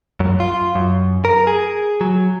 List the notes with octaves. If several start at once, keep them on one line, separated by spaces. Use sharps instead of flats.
F#2
F4
F#2
A#4
G#4
F#3